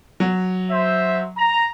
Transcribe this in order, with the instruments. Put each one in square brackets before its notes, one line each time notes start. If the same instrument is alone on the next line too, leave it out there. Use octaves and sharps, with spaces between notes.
[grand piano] F#3
[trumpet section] C5 E5
A#5